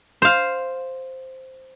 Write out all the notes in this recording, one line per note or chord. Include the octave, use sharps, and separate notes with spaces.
C5 F5